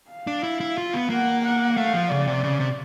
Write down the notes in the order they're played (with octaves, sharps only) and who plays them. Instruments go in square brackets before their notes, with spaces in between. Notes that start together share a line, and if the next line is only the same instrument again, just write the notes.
[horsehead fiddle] F5
[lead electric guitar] D4
E4
E4
F4
B3
[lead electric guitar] A#3 [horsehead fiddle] F#5
[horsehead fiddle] F#5
[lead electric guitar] A3 [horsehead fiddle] F5
[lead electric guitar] F3
[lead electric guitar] C#3 [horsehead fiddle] D5
[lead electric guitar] C3
C#3
C3